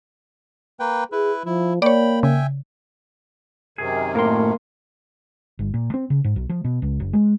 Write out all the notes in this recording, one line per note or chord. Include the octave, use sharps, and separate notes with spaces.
A#3 B4 G5
E4 G#4 B4
F3 E4
A#3 C#5 D5 G5 B5
C#3 E5 G5 G#5
F#2 C3 D#3 G#4
A2 A#3 A#4 C6
G1
A#2
C4
C#3
G#2
B1
F3
B2
C#2
F#1
G#3